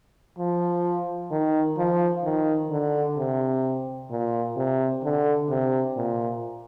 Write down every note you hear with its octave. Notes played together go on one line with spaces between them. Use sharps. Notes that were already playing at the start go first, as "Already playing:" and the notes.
F3
D#3
F3
D#3
D3
C3
A#2
C3
D3
C3
A#2